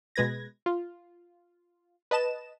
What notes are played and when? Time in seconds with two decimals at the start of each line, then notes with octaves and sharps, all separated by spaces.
0.16 B2 G#3 B4 G#6 A#6
0.66 F4
2.11 B4 D#5 A5 E7